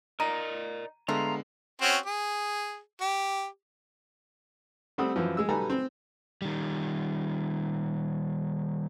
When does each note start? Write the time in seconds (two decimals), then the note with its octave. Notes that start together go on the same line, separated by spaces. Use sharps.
0.20 D#4 A#4 D5 A#5 D#7
1.08 D3 G#3 A3 B3 F4 A#5
1.82 C4 C#4 F#4
2.06 G#4
3.01 G4
4.98 G3 A3 C4 F#5 D#6 E6
5.16 F#2 E3 F3
5.37 G#3 E6
5.49 B1 G3 A4 B4 G#5 A#5
5.70 C4
6.42 D#3 G3